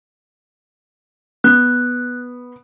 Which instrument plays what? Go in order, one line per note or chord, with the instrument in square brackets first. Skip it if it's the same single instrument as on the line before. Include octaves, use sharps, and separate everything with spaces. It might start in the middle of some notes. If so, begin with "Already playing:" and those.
[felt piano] B3 [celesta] F#6